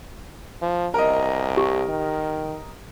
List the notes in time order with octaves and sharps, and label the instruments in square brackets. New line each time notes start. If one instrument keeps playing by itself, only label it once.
[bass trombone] F3
[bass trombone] C2 [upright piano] A#4 D#5
[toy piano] G4
[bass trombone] D#3